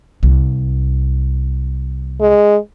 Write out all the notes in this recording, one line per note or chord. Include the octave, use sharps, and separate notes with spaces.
C2
G#3